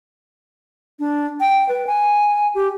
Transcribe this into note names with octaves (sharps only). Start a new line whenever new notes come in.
D4
G5
B4
G#5
G4